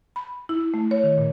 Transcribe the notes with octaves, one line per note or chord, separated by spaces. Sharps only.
B5
E4
A3
C#5
D#3
A#2